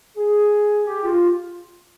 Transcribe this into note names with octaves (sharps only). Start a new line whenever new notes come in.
G#4
G4
F4